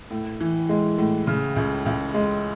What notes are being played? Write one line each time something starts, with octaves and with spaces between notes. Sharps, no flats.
A2
E3
G#3
A2
C#3
C#2
C#2
G#3